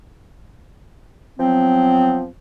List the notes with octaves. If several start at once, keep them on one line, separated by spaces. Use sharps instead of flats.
F3 F#3 B3 C4